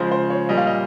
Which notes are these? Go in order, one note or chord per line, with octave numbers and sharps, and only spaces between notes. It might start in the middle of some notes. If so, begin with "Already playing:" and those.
Already playing: C#3 F3 G#3 C5
C5
C#5
A#2 G3 D#5
F5
D#5